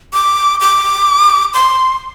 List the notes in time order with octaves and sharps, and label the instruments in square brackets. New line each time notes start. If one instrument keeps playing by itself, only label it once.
[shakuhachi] D6
D6
C6